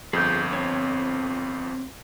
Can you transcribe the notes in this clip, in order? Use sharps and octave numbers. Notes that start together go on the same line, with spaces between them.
G1 F2 G#4 G6
C4 C#5